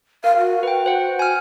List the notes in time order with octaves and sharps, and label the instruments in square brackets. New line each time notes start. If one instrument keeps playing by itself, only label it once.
[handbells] A#4 [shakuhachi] F5
[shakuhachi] F#4
[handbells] B4 G5
C5 F#5
G#5 F6